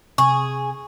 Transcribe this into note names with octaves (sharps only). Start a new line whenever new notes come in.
C3 G#4 C#6